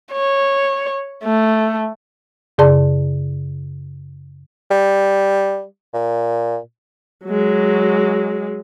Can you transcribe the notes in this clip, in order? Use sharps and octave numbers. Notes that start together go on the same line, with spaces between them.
C#5
A3
F#2 C#3 G#4 D5 A5 C6
G3
A#2
F#3 G#3